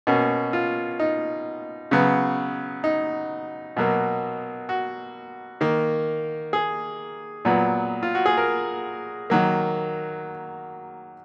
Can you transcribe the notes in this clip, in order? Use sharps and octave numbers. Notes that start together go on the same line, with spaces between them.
B2 A#3 C#4
F4
D#4
C#3 F#3 B3
D#4
B2 F#3 A#3
F#4
D#3 A#3
G#4
A#2 F#3 B3
F4
F#4
G#4
A#4
D#3 F#3 A#3